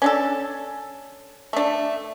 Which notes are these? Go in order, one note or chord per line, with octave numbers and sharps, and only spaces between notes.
C#4 D4 A4
A3 D4